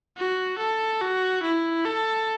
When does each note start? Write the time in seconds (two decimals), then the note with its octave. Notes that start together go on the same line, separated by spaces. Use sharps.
0.18 F#4
0.59 A4
1.01 F#4
1.43 E4
1.85 A4